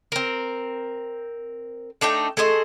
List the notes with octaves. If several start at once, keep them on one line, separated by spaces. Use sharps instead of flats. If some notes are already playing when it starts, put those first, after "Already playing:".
C4 A#4
A3 D4 D#4 G5
A3 G#4 C5 D#5